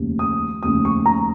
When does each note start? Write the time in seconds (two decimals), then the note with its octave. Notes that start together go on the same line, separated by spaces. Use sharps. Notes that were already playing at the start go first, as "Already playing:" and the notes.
Already playing: F1 D#2 C#3
0.19 D#6
0.63 F1 D#2 C#3 D#6
0.85 C#6
1.06 A#5